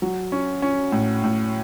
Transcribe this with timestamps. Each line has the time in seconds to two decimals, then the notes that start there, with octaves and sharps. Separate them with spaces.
0.02 F#3
0.32 C#4
0.62 C#4
0.92 A2
1.24 A2